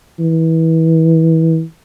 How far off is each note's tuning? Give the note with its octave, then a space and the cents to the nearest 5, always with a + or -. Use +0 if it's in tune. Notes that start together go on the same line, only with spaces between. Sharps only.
E3 -25